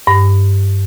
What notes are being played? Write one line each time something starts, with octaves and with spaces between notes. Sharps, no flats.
G2